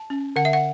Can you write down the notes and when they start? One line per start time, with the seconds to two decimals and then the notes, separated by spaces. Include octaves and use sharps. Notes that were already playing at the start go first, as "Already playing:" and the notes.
Already playing: A5
0.10 C#4
0.36 D3 F#5
0.45 E5
0.53 F#5